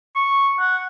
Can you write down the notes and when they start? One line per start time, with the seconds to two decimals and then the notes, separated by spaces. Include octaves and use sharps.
0.16 C#6
0.60 F#5